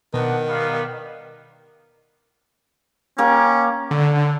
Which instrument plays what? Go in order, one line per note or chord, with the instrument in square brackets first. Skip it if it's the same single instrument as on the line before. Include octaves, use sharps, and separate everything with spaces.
[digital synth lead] B2 [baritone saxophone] D#3 [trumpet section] B3 D4 F#5
[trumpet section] G3 B3 F5
[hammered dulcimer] A#3 G4 [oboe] C#4
[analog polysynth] D3